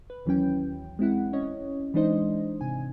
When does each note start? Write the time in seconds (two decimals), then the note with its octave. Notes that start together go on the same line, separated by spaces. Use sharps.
0.10 B4
0.25 D#2 E3 F#3 C#4 G5
0.99 G#3 C4 E4 F#5
1.33 C#4 C#5 D#5
1.94 E3 G#3 D4 D#4 C5 D#5
2.61 G#1 C3 G#5